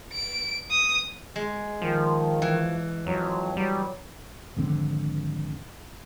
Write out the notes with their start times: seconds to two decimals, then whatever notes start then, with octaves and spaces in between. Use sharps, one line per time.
0.13 D7
0.71 D#6
1.36 G#3
1.82 D#3 F3
2.42 E3
3.06 F2 F#3
3.57 F#3 G3
4.57 G#1 F2 D3 C4